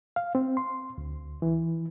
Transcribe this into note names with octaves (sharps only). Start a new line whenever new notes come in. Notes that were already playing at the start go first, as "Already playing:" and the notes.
F5
C4
C6
D2
E3